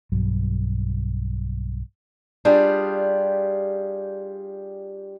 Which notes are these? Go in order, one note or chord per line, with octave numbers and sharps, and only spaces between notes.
B1 G2 F#3
G3 D4 F4 G4 G#4